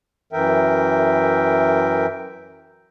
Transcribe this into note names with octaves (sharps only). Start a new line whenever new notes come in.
F#2 E3 A#4 E5 G5